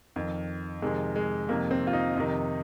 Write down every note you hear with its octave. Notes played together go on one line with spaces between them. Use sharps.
F2 D#3
F2 C3 D#3 G#3
G#3
F2 C3 D#3 A#3
C4
F4
D#4
F2 C3 D#3 D#4